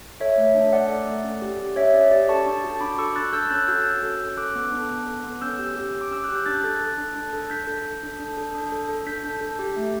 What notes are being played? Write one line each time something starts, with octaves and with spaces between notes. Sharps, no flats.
A4 C#5 E5
A3
D4
A3 D5 F#5
A4
A3
C#4
G4
G4
C#4 C#5 E5
C#4 D5
G4 D5
A4 A5 C#6
D4
F#4
D4 B5 D6
A4 C#6 E6
D4 F#6 A6
A4 E6 G6
C#4 F#6 A6
F#4 E6 G6
C#4
A4
C#4
A4 D6 F#6
B3
D4
B3
A4
B3
C#4 E6 G6
G4
G4
C#4
D6
C#4 E6
G4 F#6
G6
D4 F#6 A6
A4
A4
D4
D4
A4
D4 G6 B6
A4
A4
D4
D4
A4
D4
A4
A4
D4 G6 B6
D4
A4
G4
A3